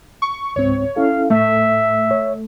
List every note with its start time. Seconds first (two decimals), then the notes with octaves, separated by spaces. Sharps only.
0.22 C#6
0.56 C#2 G#2 C4 C#5
0.96 C#4 E4 A4 F5
1.30 A2 A3 E5
2.11 C#5